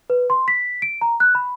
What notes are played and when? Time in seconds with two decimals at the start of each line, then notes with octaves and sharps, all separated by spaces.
0.10 B4
0.30 C6
0.48 B6
0.82 D7
1.01 A#5
1.20 F#6
1.35 B5